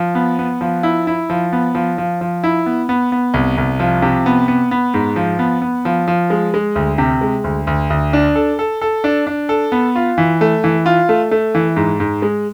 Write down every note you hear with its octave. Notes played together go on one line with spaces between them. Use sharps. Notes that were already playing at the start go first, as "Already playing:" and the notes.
Already playing: F3
B3
B3
F3
E4
E4
F3
B3
F3
F3
F3
E4
B3
B3
B3
C2
C2
F3
C3
B3
B3
B3
G#2
F3
B3
B3
F3
F3
G#3
G#3
D2
C3
G#3
D2
D2
D2
D4
A4
A4
A4
D4
D4
A4
B3
F4
E3
A3
E3
F4
A3
A3
E3
G#2
G#2
G#3